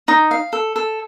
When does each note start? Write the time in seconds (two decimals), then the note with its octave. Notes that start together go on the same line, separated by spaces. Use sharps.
0.08 D#4
0.31 F5
0.53 A4
0.76 A4